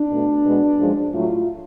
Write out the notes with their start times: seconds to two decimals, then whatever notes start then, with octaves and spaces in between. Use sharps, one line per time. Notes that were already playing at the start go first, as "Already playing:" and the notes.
Already playing: D4
0.11 B2 A3
0.45 B2 G#3 B3
0.79 F#2 F3 G#3
1.13 A2 F#3 A3 F4